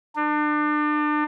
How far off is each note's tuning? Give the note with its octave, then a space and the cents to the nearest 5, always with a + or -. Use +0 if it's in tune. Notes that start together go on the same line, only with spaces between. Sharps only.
D4 +35